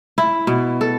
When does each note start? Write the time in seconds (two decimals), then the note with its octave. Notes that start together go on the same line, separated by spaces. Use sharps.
0.18 E4
0.47 B2
0.81 A4